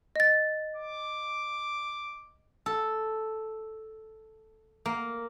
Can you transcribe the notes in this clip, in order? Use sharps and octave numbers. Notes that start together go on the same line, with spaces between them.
D#5 A6
D6
A4
A#3